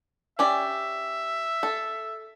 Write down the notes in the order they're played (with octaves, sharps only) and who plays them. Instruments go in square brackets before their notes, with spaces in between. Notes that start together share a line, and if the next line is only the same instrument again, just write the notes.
[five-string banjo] C#4 G4 D5 [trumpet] E5
[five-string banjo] A4